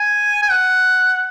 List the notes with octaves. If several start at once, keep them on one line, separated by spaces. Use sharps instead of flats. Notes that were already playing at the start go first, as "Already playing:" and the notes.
Already playing: G#5
G#5
F#5